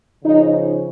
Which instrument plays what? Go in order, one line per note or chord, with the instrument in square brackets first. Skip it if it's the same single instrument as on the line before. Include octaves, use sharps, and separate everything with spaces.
[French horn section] C#3 F3 D#4